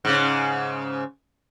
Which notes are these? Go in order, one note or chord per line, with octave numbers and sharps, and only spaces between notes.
G#2 C#3